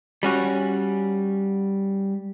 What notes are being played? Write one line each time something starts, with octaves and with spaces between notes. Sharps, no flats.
G3 C#4 F#4